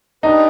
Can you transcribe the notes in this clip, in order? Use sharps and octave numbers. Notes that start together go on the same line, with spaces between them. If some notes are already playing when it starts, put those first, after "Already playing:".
D4 D#4 G4 B4